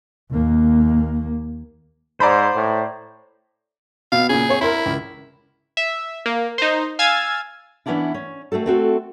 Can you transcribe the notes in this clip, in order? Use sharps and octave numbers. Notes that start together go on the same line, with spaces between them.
D#2 A#3
G#2 C5 D5 A#5 B5
A2
B2 F5
A#2 C#3 G#4
C4 C#5
E4 A#4 B5 C6
C#2
E5
A#3
D#4 C5
F5 G#5 E6 G#6 A6
E3 A#3 B3 C#4 D4 E4
C#4
A3 C4 F#4 A4
A3 C4 F#4 A4